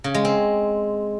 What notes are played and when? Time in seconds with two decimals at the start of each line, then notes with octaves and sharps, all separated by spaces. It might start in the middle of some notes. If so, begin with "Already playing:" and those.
0.04 C#3
0.14 G#3
0.25 C4